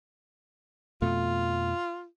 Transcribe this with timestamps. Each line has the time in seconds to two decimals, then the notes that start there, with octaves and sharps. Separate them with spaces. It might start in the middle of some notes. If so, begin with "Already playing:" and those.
1.02 F2 B2 A3 F4